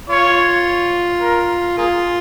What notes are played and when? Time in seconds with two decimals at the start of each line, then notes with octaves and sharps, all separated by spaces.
0.09 F4 C#5
1.21 A#4
1.77 A#3 F4 G#4